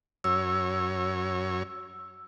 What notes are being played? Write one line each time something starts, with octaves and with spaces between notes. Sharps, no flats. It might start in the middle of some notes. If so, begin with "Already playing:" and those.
F#2 C#5 E6